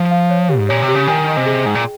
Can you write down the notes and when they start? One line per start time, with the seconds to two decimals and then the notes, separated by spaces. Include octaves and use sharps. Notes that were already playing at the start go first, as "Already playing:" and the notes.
Already playing: F3 F5
0.11 F5
0.30 C#5
0.49 G4
0.57 G#2
0.69 A#2 C#5
0.82 C3
0.88 G4
0.95 C#3
1.07 D#3 G#5
1.27 D#5
1.37 C3
1.46 G#4
1.66 G#2 G5
1.75 A#2